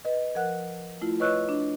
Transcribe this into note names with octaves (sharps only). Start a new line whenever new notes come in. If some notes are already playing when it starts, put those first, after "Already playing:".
B4 D#5
F3 A#4 F#5 F#6
A3 E4 F4
B4 C#5 D#5 C#6 E6 F#6
D4